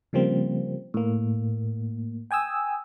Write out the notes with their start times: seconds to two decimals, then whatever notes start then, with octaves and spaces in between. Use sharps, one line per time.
0.13 C#3 F3 G3 A#3 C4
0.94 A2 A#3
2.31 G5 G#5 D#6 E6